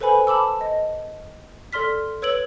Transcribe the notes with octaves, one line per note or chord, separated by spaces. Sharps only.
A4 B4 C5 G#5 B5
A5 B5 D6 E6
D#5
A4 D5 C6 F6 B6
B4 C#5 E6 G#6 D7 F#7